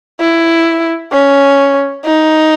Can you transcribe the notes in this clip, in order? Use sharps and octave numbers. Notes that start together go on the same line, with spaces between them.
E4
C#4
D#4